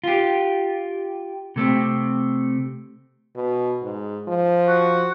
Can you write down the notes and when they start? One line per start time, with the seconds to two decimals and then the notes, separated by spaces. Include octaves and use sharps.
0.04 F4 G4
1.56 C3 A3 C4
3.36 B2
3.83 G#2
4.28 F3
4.68 F#4